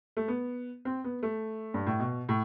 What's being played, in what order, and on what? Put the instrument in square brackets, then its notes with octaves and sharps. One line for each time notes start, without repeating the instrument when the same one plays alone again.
[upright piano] A3
B3
C4
B3
A3
G2
A2
B2
A2